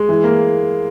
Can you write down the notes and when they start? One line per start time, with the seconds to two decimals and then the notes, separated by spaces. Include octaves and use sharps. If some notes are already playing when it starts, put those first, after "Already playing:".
Already playing: G#3
0.09 E3
0.24 A#3